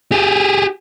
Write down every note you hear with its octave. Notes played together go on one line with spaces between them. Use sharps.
G4 G#4